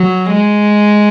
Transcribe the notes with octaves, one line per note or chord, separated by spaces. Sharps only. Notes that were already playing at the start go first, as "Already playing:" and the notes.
Already playing: F#3
G#3